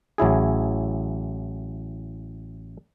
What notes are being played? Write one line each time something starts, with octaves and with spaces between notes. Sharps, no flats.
A1 F#3 E4 G#4